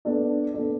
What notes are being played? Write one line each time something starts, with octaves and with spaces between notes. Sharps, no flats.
B3 D4 A4 D5
B3 D4 A4 D5